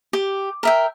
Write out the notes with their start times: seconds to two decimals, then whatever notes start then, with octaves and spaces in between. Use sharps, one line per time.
0.13 G4
0.63 A#4 E5 G5